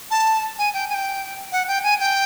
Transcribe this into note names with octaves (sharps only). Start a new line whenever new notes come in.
A5
G#5
G5
G#5
G5
F#5
G5
G#5
G5